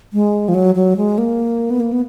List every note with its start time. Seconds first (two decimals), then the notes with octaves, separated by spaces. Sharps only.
0.13 G#3
0.48 F3
0.54 F#3
0.75 F#3
0.97 G#3
1.18 A#3
1.70 B3
1.80 A#3
1.93 B3